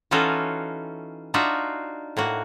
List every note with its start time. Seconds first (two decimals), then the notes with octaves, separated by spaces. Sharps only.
0.11 E3 C#4 D#4 F4 F#4 A4
1.34 D4 D#4 F4 F#4 E5
2.17 A2 A#3 F#4